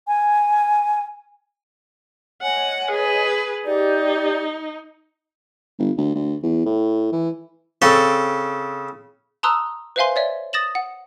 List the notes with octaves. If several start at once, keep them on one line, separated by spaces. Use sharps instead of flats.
G#5
C#5 D#5 F#5 G#5
G#4 B4
D#4 G4 D5 G6
G1
D2
D2
E2
A2
E3
C#3 C4 A4
A5 A#5 C6 D#6 E6 F#6
B4 C5 E5 F5 G#5 C6
C#5 D5 E5
D#6 A6 A#6 E7 F#7
F#5